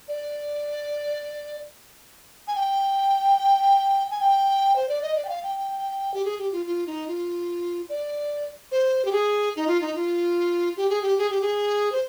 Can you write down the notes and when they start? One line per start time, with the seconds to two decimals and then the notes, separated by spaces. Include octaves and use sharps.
0.08 D5
2.47 G#5
2.55 G5
4.11 G#5
4.20 G5
4.76 C5
4.89 D5
5.02 D#5
5.15 D5
5.25 G5
5.29 F5
5.43 G5
6.14 G4
6.25 G#4
6.38 G4
6.52 F4
6.66 F4
6.87 D#4
7.08 F4
7.89 D5
8.71 C5
9.05 G4
9.12 G#4
9.56 D#4
9.67 F4
9.81 D#4
9.95 F4
10.77 G4
10.90 G#4
11.02 G4
11.18 G#4
11.30 G4
11.41 G#4
11.92 C5